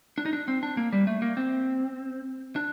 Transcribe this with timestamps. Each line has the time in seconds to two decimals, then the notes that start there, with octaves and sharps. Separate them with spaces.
0.18 D4
0.26 D#4
0.33 D4
0.48 C4
0.63 D4
0.77 A#3
0.93 G3
1.07 A3
1.22 A#3
1.37 C4
2.56 D4